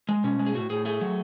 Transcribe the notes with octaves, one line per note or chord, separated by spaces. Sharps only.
G#3
B2 C#4
G#3
G#4
A2 F#4
A2 G#4
A3 G#4
F#3